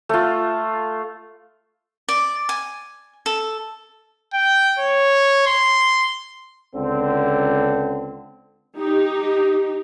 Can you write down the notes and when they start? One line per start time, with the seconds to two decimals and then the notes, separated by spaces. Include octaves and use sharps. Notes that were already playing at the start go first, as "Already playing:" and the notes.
0.09 A3 F4
2.09 D5
2.49 G#5
3.26 A4
4.33 G5
4.79 C#5
5.46 C6
6.75 C#2 D3 C4
8.78 D#4 G4